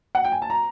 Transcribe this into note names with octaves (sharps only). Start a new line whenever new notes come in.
F#5
G5
G#5
A5
A#5